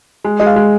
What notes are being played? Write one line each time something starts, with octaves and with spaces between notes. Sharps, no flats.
G#3
G#3 D#5
F5
G#3